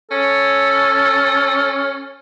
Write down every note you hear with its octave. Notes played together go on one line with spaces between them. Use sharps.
C#4 A4